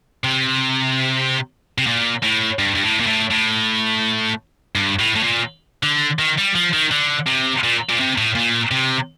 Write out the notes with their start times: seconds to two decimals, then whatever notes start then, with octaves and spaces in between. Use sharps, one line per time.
0.24 C3
1.78 C3
1.87 A#2
2.23 A2
2.59 G2
2.75 G2
2.83 A2
3.00 A#2
3.07 A2
3.31 A2
4.75 G2
4.99 A2
5.15 A2
5.23 A#2
5.83 D3
6.19 D#3
6.38 G3
6.55 F3
6.73 D#3
6.91 D3
7.27 C3
7.63 A#2
7.89 A#2
7.99 C3
8.18 A2
8.35 A#2
8.71 C3